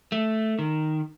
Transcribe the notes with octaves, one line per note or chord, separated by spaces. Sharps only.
A3
D#3